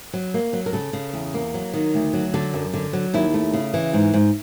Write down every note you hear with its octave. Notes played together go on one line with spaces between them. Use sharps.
F#3
A#3
F#3
A#4
C#3 A4
C#3
E2
A#3
F#3
D#3
D2
F#3
D3 A4
F#2
D3
F#3
D#2 E4
A3
C#3
E3
G#2
G#2